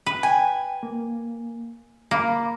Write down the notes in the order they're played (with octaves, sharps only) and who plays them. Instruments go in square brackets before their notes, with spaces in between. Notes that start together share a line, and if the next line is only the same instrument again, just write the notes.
[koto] B4
[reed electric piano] G5 [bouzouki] G#5
[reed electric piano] A#3
[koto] A#3 [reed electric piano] B5 D6